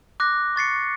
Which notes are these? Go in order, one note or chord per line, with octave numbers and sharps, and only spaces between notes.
D6 F#6 A#6
C#6 A6 C7 C#7